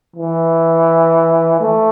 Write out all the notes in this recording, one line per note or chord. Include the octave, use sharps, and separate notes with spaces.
E3
A3